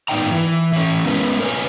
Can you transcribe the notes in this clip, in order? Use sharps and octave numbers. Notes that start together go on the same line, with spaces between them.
G#2 B3 D#4 D5 G5 A#5
E3
E3 C#4
G#3 B3 C#4 A#4 B4
A#4 B4 C#5 D#5 G#5